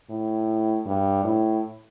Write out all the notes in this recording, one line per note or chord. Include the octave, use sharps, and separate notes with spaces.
A2
G2
A2